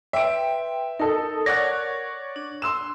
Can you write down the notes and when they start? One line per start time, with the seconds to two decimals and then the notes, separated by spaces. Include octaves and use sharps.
0.13 B4 E5 G5 C6 D7
0.99 D#4 A4 A#4
1.46 C#5 D5 F#5 F#6 A#6
2.36 D4
2.62 C6 E6 E7